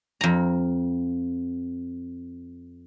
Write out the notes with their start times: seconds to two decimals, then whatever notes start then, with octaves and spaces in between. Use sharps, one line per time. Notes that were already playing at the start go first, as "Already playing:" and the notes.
0.21 F2 A#5